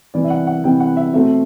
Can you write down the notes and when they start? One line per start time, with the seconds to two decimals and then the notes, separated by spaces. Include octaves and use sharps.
0.14 C3 E3 G3 B3 D5
0.24 E5
0.30 F#5
0.47 F#5
0.64 C3 E3 G3 B3 G5
0.80 F#5
0.97 E5
1.13 B2 A3 C4 E5